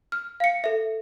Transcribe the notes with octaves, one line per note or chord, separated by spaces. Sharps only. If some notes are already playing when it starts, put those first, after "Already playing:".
F6
F5 C#7
A4 E5